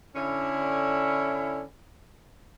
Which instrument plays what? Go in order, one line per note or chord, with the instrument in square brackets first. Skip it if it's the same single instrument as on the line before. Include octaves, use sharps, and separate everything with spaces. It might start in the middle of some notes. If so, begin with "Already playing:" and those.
[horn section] D3 C#4 E4